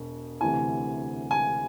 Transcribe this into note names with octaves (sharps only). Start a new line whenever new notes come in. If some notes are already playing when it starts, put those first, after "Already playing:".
Already playing: E1 B2
D2 C3 E3 G#5
G#5